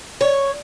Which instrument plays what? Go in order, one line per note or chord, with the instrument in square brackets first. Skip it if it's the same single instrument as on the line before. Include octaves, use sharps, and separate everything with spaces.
[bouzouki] C#5